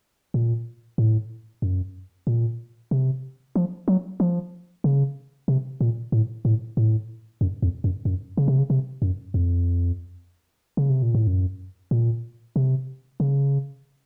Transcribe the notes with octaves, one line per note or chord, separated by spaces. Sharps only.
A#2
A2
F#2
A#2
C3
F3
F#3
F3
C#3
C3
A#2
A2
A2
A2
F#2
F2
F#2
F#2
C#3
C3
C#3
C3
F#2
F2
C#3
C3
A#2
A2
F#2
A#2
C3
C#3